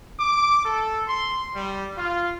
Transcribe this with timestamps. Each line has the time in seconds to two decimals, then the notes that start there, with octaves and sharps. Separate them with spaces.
0.20 D6
0.65 A4
1.08 C6
1.53 G3
1.97 F4